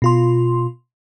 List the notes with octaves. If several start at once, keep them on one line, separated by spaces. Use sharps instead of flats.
B2 F4 C6